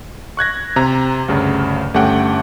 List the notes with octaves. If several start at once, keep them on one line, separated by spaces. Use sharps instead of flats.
C#6 F#6 G#6 A#6
C3 A#5
D2 G2 C#3
G1 A3 C#4 G4 F#5 G5